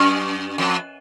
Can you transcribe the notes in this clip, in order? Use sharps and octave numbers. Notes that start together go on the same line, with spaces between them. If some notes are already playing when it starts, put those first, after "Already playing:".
Already playing: F#2
F2